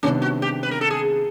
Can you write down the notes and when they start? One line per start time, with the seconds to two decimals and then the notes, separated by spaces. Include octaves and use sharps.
0.03 C3 D#3 G3 B3 C#4 D4
0.22 F#4
0.42 G4
0.63 B4
0.71 A#4
0.81 A4
0.90 G#4